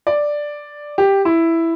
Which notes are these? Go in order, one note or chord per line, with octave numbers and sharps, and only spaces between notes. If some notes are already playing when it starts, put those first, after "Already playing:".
D5
G4
E4